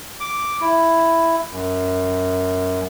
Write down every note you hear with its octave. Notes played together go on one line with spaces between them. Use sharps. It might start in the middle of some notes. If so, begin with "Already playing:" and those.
D6
E4
F#2